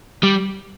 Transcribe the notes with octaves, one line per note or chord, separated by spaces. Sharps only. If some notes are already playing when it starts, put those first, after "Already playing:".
G3